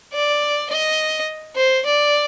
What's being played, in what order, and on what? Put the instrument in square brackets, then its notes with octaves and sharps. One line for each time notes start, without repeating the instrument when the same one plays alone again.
[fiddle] D5
D#5
C5
D5